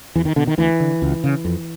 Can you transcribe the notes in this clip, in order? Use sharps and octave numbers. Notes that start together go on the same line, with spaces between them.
E2 E3
D#3
B2 D3
D#3
D2 E3
D3
C#2
C#3
F2